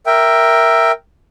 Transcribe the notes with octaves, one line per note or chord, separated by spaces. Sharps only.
A#4 E5 G5